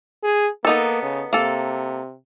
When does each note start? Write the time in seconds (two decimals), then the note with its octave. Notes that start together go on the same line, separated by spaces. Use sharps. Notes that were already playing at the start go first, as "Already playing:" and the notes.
0.24 G#4
0.65 A#3 B3 D#4 A4
1.03 C#3
1.33 C3 A#3 A4